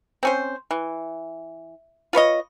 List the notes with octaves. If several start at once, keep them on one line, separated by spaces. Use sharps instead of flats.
C4 C#4 C5
E3
F4 B4 C#5 D#5